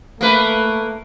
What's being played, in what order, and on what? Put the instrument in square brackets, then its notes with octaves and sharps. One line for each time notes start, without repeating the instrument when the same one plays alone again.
[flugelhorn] A3 [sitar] A#3 B4